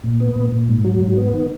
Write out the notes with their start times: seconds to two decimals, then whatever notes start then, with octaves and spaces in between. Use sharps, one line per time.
0.04 A#2
0.20 B3
0.36 A#2
0.52 A#2
0.69 G#2
0.85 F#3
1.00 G#2
1.17 B3
1.34 D#3